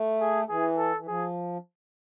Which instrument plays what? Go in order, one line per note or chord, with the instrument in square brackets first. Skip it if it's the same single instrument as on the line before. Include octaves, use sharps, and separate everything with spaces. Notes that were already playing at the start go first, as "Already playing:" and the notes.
Already playing: [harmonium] A3
[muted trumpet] G#4
[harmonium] E3 [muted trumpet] G#4
[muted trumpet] A4
[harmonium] E3
[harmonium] F3 [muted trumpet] G#4